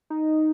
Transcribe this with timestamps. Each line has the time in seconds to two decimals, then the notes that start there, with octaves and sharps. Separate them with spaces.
0.10 D#4